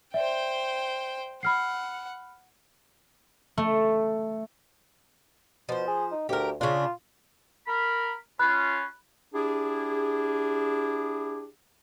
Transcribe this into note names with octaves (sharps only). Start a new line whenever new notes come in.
C5 D5 E5 G5
F#5 B5 F6 C7
A3
B2 F3 C5
G#4
D#4
D2 G4 A#4
C#3 D4 F4
A#4 B5
C#4 F4 B5 F#6
D4 E4 G4 G#4